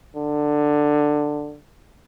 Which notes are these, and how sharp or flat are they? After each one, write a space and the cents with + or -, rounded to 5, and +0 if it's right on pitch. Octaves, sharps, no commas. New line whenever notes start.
D3 +10